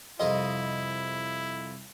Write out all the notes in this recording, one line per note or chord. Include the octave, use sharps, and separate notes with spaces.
C2 F2 E4 F4 D#5